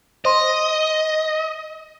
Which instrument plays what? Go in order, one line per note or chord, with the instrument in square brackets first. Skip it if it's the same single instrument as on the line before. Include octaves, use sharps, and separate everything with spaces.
[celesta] C5 C6 [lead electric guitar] D#5